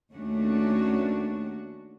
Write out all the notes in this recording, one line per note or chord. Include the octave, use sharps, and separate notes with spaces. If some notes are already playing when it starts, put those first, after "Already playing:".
D#2 A3 C#4 D4 F#4